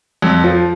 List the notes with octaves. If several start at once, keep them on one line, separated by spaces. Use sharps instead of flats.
F2
F3